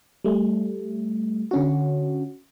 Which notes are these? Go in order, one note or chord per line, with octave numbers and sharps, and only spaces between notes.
G3 A3
D3 C#4 F#4